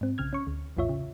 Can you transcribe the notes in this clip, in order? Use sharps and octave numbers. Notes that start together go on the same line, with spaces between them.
G#2 C4
B1 C#3 F6 G#6
C#4 C#6
D2
A#1 E2 A2 F4 C#5 E5
C#3